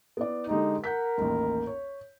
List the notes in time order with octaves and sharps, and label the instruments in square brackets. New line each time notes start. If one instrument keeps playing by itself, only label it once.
[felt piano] B3 E4 D5
[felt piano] D3 G#3 G4 [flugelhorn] D#4
[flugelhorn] A#4 [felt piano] F#5 G6 B6
[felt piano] A1 D#2
C#5